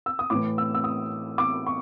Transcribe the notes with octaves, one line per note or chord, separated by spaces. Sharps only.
E6
D#6
A2 E3 D6
E6
E6
D#6
D6
C#6